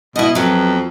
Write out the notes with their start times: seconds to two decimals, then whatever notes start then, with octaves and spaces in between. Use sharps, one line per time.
0.16 B2 E4 D#5
0.35 F2 F#3 B3